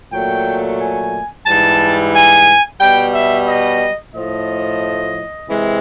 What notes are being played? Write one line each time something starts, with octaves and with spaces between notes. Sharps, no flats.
A#2 F#3 A3 G5
G#5
G#2 E3 G3 A5
G#5
B2 G3 G5
E5
D#5
A2 F3 A3 D#5
C3 E3 G#3